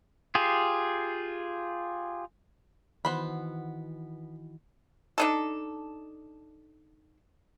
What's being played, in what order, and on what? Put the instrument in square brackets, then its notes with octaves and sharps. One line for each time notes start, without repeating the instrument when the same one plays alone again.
[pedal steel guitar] F4 G4 G#4
[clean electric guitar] D#3 E3 F#4 [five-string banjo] B3 C5 B5
[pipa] D4 D#4 A4